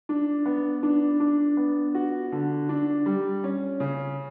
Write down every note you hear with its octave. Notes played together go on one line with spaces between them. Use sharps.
D4
B3
D4
D4
B3
F#4
D3
D4
G3
C#4
C#3